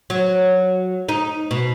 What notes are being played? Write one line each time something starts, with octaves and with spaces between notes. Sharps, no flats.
F#3
D#4
B2